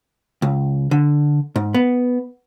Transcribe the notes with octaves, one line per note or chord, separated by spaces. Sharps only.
C#2
D3
G#2
B3